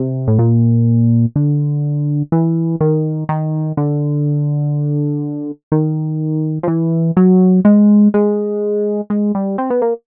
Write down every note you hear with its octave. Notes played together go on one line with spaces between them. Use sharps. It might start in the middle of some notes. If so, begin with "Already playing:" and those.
Already playing: C3
A2
A#2
D3
E3
D#3
D#3
D3
D#3
F3
E3
F#3
G#3
G#3
G#3
G3
C4
B3
A#3